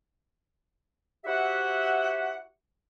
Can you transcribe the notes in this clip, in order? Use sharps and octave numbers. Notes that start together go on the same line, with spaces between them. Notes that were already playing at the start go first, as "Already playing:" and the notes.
E4 F#4 G4 C5 E5 F#5